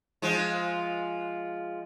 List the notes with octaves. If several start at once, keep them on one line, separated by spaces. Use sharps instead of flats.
F3 G#3 F4